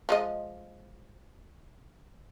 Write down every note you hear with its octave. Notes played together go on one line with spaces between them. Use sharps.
F3 G#3 D#5